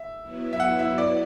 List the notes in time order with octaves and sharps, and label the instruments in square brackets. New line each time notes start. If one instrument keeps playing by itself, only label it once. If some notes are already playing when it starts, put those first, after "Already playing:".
Already playing: [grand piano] E5
[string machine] F#3 B3 E4
[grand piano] E5
F#5
E5
D5